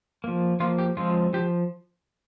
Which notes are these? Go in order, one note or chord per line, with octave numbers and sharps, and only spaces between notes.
F3 A#3
F3 A#3 F4
G4
F3 G#3 C4 F4
F3 G4